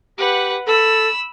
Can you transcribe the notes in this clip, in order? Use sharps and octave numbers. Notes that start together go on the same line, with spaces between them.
G4 B4 F#5
A4 B5 E6